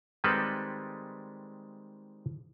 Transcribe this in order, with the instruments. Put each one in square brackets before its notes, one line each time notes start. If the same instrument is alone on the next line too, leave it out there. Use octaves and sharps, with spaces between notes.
[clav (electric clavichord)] D#3 G3 G#3 C4 A4 B4